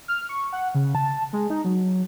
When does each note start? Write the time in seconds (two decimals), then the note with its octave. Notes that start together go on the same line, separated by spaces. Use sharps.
0.08 F6
0.29 C#6
0.53 F#5
0.75 C#3
0.95 A5
1.33 G#3
1.50 D#4
1.65 F#3